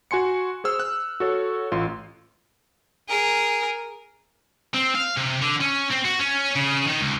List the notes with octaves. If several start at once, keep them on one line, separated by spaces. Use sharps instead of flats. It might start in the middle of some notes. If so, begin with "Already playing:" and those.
F#4 G#5 C6 C#7
G#4 C5 E6 F6
F#6
F#4 A4 C#5
A1 F4 C6
G#4 A#4
C4
F5
C3
D3
C#4
C4
F#4
C#4
C#3
D#3
C#2